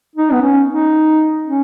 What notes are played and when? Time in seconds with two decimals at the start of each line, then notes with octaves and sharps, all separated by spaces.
0.16 D#4
0.32 B3
0.42 C#4
0.68 D#4
1.46 C#4